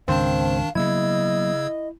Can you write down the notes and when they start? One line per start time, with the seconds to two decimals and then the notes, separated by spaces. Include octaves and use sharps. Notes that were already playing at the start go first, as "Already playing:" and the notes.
0.08 C#2 G#2 D#3 C4 D4 C5 F5 A5
0.75 C#3 F#3 A#3 B3 E4 D#5 E6 G#6